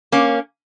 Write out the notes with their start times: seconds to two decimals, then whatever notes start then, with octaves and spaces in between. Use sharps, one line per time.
0.12 A#3 C#4